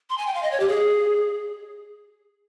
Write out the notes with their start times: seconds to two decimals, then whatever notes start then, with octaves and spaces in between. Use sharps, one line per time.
0.10 C6
0.18 G#5
0.27 G5
0.34 F5
0.43 D#5
0.51 C#5
0.60 G4
0.68 G#4